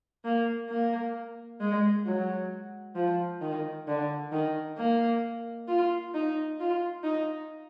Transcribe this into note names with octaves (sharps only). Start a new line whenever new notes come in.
A#3
A#3
G#3
F#3
F3
D#3
D3
D#3
A#3
F4
D#4
F4
D#4